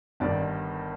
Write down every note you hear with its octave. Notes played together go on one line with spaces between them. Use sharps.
G1 G2 D#3 D5